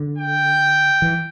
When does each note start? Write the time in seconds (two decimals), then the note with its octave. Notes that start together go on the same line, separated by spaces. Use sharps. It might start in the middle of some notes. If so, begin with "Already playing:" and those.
Already playing: D3
0.18 G5
1.02 E3